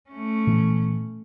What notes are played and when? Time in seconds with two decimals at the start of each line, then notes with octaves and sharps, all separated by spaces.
0.10 A3 C#4
0.47 A#2 E3 B3